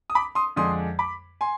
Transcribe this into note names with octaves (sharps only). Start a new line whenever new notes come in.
D#6
B5 D6
C6 D#6
F2 D3 G#3 D4 C6 D#6
B5 D6
G#5 C6